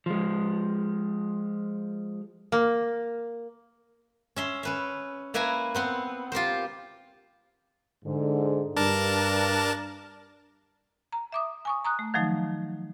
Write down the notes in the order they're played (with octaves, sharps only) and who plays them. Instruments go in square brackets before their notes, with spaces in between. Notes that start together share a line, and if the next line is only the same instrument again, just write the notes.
[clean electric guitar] F3 G#3
[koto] A#3
[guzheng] C#4 E5 C6
C#4 B4 E5
A#3 E4 B4 E5 G#5 A#5
B3 C4 B4
F4 G4 A#4 C5
[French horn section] G#2 D3
[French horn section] G2 [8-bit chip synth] D4 A#4 A5
[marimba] A#5
E5 D6 D#6
G#5 C#6 D#6
A#5 D#6 F#6
A3
D#3 F3 F#3 A3 D#4